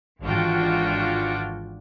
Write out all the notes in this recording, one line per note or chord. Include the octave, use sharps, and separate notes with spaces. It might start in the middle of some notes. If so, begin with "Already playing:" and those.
G#1 E3 D4 F4 F#4 G5